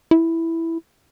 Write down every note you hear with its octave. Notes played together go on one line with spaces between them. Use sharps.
E4